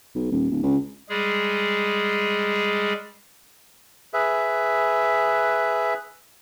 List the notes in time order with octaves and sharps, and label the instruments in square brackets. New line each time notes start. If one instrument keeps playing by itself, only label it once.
[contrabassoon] B1
D#1
D1
C#2
[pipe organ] G3 G#3 G#4
[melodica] G#4 B4 E5